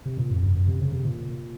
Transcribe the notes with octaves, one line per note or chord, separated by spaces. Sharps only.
C3
A#2
F2
F#2
F#2
C3
C#3
C3
A#2